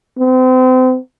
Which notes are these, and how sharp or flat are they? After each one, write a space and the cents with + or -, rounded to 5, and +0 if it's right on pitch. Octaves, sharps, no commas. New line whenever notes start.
C4 -35